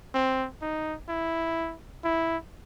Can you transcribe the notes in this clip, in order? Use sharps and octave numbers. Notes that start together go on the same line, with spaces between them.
C4
D#4
E4
E4